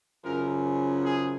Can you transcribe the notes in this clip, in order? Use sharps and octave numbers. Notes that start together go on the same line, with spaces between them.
F#2 C#3 F3 A#4
G#4